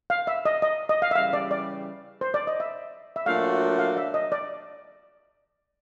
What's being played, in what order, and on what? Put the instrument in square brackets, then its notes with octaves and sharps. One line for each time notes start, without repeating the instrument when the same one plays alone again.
[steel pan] F5
E5
D#5
D#5
D#5
F5
E5
[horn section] C#3 E3 G3 [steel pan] F5
[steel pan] D5
D5
C5
D5
D#5
E5
E5
[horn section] A#2 F#3 A3 D4 F#4 [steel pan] F5
[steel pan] F5
E5
D#5
D5